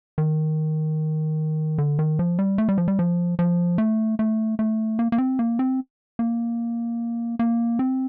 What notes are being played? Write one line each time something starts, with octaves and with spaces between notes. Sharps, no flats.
D#3
D3
D#3
F3
G3
A3
G3
F3
G3
F3
F3
A3
A3
A3
A#3
A#3
C4
A#3
C4
A#3
A#3
C4